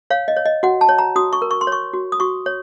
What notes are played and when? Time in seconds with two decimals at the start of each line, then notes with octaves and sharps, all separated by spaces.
0.10 C#5 F5
0.28 D#5
0.37 C#5
0.46 D#5
0.63 F#4 F#5
0.81 A5
0.89 C#5
0.98 A#5
1.16 F#4 D#6
1.33 C#6
1.42 A#4
1.51 C#6
1.61 C6
1.67 C#5
1.72 C#6
1.93 F#4
2.12 D#6
2.20 F#4 C#6
2.46 C#5